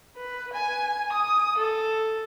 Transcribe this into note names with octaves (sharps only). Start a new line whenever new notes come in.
B4
G#5
D#6
A4